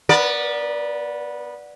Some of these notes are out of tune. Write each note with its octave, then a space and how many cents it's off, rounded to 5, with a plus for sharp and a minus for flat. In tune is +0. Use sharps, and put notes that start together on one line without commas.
B3 -15 A#4 +30 D5 +0